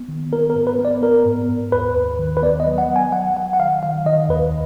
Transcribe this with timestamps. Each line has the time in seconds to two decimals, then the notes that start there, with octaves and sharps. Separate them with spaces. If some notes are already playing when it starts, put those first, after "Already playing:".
Already playing: B3
0.08 D#3
0.33 B3 A#4
0.50 A#4
0.55 G#2
0.67 B4
0.79 B3
0.85 D5
1.02 B3 A#4
1.25 G#2
1.49 G#2
1.72 D#2 B4
1.95 D#2
2.19 D#3
2.37 B4
2.42 B3 D5
2.60 D#5
2.66 F#3
2.78 F#5
2.89 F#3
2.96 G#5
3.12 F#3 F#5
3.36 F#3 F#5
3.53 F#5
3.59 D#3 F5
3.83 D#3 F5
4.06 D#3 D#5
4.29 D#2 B4